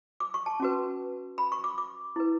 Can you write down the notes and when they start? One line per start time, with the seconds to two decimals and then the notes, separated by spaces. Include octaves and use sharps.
0.20 D6
0.34 C#6
0.46 A5
0.60 C#4 F#4 B4
1.38 B5
1.52 C#6
1.64 D6
1.78 D6
2.16 E4 B4